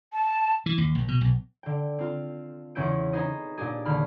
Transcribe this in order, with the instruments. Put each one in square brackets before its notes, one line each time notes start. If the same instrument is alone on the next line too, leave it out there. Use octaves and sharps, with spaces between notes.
[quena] A5
[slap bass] E3
D#2
A#1
B2
B1
[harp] D3 G5
C4 F4
E2 C#3 C#4 E4 G6 D7
D#4 G#4 B4 C5 D#5
A#2 D4 G4 G#4
D#2 D3 B5 F6